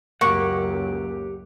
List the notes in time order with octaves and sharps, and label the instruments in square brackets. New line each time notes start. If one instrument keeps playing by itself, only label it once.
[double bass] C#2 F#2 [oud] A#3 [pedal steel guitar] G4 F#5 [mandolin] C#6